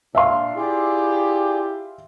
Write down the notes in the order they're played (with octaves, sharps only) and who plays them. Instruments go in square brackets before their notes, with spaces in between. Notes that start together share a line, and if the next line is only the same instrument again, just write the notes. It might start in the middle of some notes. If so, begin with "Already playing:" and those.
[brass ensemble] A#2 D4 [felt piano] E5 F5 C6
[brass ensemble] E4 G4 [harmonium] F4 G#4 D5